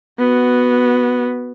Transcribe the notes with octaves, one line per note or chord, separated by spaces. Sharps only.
B3 F#4